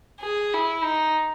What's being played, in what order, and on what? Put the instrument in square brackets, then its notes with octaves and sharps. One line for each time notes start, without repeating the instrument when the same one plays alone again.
[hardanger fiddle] G#4
E4
D#4